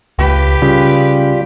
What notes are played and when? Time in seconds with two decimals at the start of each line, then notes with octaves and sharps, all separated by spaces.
0.19 C#2 G4 B4
0.62 C#3 G3 F4